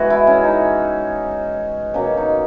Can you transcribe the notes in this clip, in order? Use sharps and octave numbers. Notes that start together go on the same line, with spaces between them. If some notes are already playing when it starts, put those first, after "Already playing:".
Already playing: E3 G#3 B3 F#4 G#4 B4
E4
C#4
D#4
B2 F#3 A#3 C#4
D#4